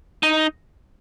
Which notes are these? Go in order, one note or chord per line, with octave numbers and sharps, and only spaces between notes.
D#4